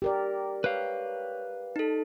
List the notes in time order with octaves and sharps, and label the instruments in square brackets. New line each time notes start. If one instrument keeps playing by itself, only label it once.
[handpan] G4 A#4 D5
[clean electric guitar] B4 F5 [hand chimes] C#5
[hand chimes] D#4 A4